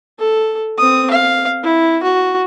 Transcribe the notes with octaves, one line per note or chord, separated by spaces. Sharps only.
A4
C4 D#6
F5
E4
F#4